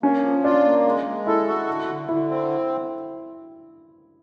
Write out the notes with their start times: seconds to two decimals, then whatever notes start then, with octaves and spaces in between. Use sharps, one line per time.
0.03 A#3 C#4
0.23 F3
0.44 D4 F4
0.65 A#3
0.86 G#3
1.06 G#3
1.26 E4 A4
1.48 F#4
1.67 D3
1.88 D3
2.08 D3 E4
2.30 C4